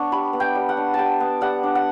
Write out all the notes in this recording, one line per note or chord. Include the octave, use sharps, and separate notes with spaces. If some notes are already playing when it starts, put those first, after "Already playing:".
Already playing: B3 D4 C#6
G3 B5
B3
G5
G3
F#5
D4
G3 G5 A5
B3
G3 F#5
D4
F#5